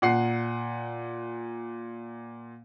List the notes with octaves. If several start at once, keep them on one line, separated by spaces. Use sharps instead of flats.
A#2 F#5 C7